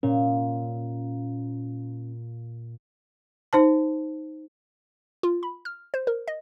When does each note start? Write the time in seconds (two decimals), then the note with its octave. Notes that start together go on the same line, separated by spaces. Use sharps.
0.03 A#2 C#4
3.53 D#4 C5 A5
5.23 F4
5.43 B5
5.65 F6
5.94 C5
6.07 A#4
6.28 D#5